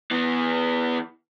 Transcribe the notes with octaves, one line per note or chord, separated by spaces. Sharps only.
E3 B3